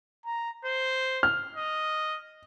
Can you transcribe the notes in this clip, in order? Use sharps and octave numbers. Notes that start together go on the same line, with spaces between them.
A#5
C5
F6
D#5